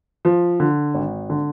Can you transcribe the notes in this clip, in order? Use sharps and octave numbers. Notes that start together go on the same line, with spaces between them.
F3
D3
G#1
D3